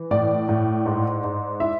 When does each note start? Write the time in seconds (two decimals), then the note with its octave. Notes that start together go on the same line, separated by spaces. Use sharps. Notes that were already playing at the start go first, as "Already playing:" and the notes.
Already playing: E3
0.11 A2 D5
0.49 A2
0.86 G#2
1.24 G#2
1.60 E4 E5